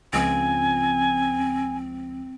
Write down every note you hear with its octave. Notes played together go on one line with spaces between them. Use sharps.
C#2 F3 C4 G#5